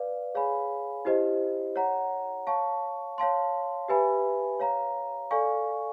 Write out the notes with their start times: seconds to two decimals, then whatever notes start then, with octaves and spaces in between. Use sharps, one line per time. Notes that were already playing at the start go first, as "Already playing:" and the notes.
Already playing: B4 D5 F5
0.35 G#4 C#5 F5 G#5 B5
1.05 E4 G4 C5 D#5
1.76 C#5 F#5 A#5
2.47 C#5 F5 A5 C#6
3.18 C#5 F5 A5 C6
3.88 G4 B4 E5 G#5 B5
4.60 C#5 F5 A#5
5.31 A4 D5 F5 G#5 C#6